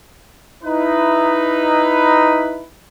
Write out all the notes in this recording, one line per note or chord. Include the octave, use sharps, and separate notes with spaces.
D#4 E4 B4